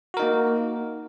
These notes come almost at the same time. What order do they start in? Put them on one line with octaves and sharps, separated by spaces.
F#4 A#4 D#4 A#3